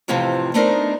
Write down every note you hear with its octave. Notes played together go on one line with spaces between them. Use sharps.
F2 A2 C3 E3 F3
A3 B3 D4 D#4 A#4 C5